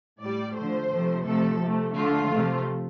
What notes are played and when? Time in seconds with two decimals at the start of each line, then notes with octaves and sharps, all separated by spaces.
0.21 A2 G3 D5
0.56 D3 F3 A3 C5
0.91 C3 F3 A3
1.25 C3 F3 A3 A4
1.60 C3 A3
1.95 D3 A3 F4
2.30 C3 F3 A3